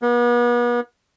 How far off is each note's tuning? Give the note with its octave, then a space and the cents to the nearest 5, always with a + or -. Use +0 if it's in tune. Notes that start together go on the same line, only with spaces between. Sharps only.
B3 -40